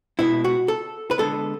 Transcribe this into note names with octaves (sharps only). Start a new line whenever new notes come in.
B2 G#3 B3 E4
F#4
A4
B4
D3 G#3 B3 A4